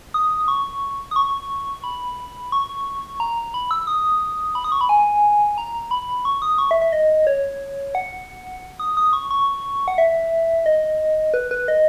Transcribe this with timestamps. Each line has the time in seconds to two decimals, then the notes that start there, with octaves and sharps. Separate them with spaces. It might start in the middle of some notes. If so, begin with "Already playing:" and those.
0.14 D#6
0.48 C#6
1.11 D#6
1.16 C#6
1.84 B5
2.52 C#6
3.20 A#5
3.54 B5
3.71 E6
3.87 D#6
4.55 B5
4.64 D#6
4.72 C#6
4.81 B5
4.89 G#5
5.58 A#5
5.91 B5
6.25 C#6
6.42 D#6
6.58 C#6
6.71 E5
6.82 E5
6.92 D#5
7.27 C#5
7.95 F#5
8.79 D#6
8.97 D#6
9.13 C#6
9.31 C#6
9.88 F#5
9.98 E5
10.66 D#5
11.34 B4
11.51 B4
11.68 D#5